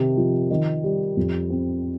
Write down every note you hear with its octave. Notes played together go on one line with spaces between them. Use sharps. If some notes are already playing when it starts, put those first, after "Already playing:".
Already playing: C3 D#3
F3
D#3
G3
F2
C4